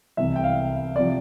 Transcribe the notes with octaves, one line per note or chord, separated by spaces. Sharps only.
C2 C3 E3 E5
G5
F5
C3 F3 D5